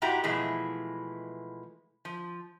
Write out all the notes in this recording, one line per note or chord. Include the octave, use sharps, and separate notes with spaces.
G#2 E4 F#4 G4 A#5
B2 E3 F3 G#3 A3 E4
F3